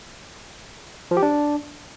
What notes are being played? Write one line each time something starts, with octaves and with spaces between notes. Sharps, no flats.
F3
G4
D4